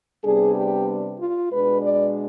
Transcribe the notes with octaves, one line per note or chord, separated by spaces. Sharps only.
C3 G3 B3 D4 G#4
G4
F4
B2 G#3 D4 B4
D5